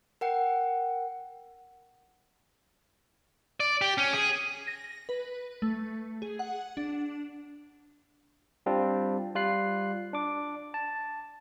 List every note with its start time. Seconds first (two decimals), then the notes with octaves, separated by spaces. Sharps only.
0.21 A#4 F#5 G5
3.60 D5
3.82 G4
3.98 C#4
4.13 G#4
4.67 A#6
5.09 B4
5.62 A3
6.22 G#4
6.39 F#5
6.77 D4
8.66 G3 C4 D4 F4
9.35 G3 F4 F#6 C7
10.13 D4 D6
10.74 A5